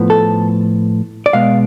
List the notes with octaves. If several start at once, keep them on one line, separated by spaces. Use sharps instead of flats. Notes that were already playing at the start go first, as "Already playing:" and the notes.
Already playing: A2 F3 B3
A4
D5
B2 G#3 B3 F5